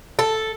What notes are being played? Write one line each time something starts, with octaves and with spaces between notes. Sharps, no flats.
A4